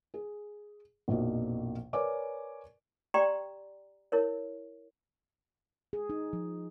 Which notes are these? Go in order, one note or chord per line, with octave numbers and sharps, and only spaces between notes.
G#4
A#1 F2 B2 A#3 D#4
A#4 B4 C#5 D5 G#5 D6
G4 D5 G5 A#5 C6
E4 A#4 C#5
G#4
D#4
F3